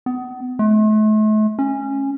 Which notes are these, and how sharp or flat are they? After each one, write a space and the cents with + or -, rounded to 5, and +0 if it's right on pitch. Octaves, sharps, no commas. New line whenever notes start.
B3 +30
A3 -40
C#4 -15